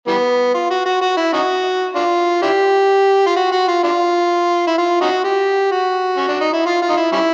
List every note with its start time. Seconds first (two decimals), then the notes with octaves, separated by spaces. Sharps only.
0.07 E3 G3 B3
0.54 F4
0.71 F#4
0.85 F#4
1.01 F#4
1.17 E4
1.33 C#4 D#4 F#4
1.95 D4 F4
2.42 D4 E4 G4
3.26 F4
3.36 F#4
3.52 F#4
3.68 F4
3.84 D4 F4
4.67 E4
4.78 F4
5.01 C#4 D#4 F#4
5.24 G4
5.72 F#4
6.17 C#4
6.28 D4
6.41 D#4
6.53 E4
6.66 F4
6.82 F4
6.89 D#4
6.97 E4
7.12 G3 C#4 E4